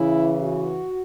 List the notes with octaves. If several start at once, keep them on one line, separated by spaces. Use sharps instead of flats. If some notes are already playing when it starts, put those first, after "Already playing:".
Already playing: C#3 E3 E4
F#4